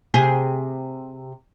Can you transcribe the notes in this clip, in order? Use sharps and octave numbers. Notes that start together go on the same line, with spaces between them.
C3 G4 G#4